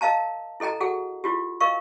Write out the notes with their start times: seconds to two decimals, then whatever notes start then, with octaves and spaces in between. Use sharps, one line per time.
0.01 A#4 D#5 F5 A5 A#5
0.60 E4 A4 D#5 G5 A#5
0.80 F#4 G#4 A4 F#5 G5
1.24 E4 F4 G4
1.60 A#4 D#5 F5 C#6